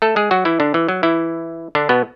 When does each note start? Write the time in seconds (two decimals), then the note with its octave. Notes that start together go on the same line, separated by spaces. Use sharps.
0.02 A3 A4
0.16 G#3 G#4
0.31 F#3 F#4
0.45 E3 E4
0.60 D3 D4
0.74 E3
0.88 F#3
1.03 E3 E4
1.75 D3 D4
1.89 B2 B3